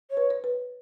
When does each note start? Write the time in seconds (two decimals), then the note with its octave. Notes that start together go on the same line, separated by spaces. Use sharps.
0.10 C#5
0.17 B4
0.30 C#5
0.44 B4